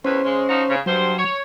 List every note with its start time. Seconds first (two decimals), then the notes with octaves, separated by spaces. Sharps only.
0.04 E2 C#3 C#4 B4 C5
0.24 C#3 G#3
0.49 F3 D#4 F#4
0.69 C#3
0.86 G2 F#3 C5
1.17 C#5